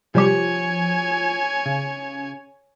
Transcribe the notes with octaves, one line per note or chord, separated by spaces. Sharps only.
C3 F3 G3 G4 C#5 G#5
C#3